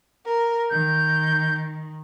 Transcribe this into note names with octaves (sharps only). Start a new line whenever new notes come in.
A#4
D#3 G6